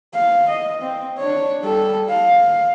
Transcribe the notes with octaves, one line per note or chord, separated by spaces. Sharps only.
F5
D#5
C4
D4 C#5
G3 A4
F5